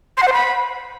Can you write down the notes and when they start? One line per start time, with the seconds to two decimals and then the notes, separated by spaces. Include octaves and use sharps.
0.17 C6
0.22 F#5
0.28 C5
0.33 B5